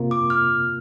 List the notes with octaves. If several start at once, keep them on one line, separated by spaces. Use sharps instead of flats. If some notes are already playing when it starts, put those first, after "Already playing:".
Already playing: C3 A#3 F4 A#4
D6
F6